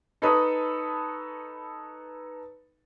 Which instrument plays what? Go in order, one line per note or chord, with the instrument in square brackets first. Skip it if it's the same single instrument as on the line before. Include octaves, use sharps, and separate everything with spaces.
[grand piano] D#4 A4 B4 C#5 B5 D#6